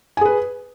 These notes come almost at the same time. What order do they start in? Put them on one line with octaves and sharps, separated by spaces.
G#5 G#4 B4